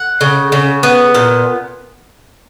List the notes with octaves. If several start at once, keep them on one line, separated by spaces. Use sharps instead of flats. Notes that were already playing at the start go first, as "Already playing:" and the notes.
Already playing: F#5
C#3
C#3
B3
A#2